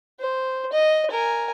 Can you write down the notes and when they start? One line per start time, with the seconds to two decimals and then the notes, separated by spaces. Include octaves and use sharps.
0.20 C5
0.72 D#5
1.11 A#4 G#5